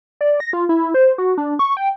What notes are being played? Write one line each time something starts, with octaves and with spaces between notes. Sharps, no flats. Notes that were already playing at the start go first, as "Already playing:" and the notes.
D5
A#6
F4
E4
C5
F#4
D4
C#6
G5